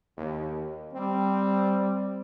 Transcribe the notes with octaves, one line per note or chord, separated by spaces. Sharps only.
D#2
G3 C4